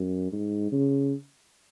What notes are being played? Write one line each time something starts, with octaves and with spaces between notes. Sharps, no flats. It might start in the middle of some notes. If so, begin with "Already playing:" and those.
Already playing: F#2
G#2
C#3